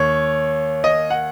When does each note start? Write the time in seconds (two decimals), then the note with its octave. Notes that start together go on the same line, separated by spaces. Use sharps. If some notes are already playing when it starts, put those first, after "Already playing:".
Already playing: D#2 C#5
0.84 D#5
1.10 F#5